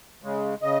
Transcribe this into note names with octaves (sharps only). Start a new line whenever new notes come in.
C#3 G#3
C#3 D#5